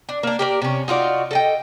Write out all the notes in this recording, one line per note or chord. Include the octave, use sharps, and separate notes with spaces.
D4
A#3 D4
G4 A#4 D5
C3 C#4
D#4 F4 F#4 D5
A4 D#5 G5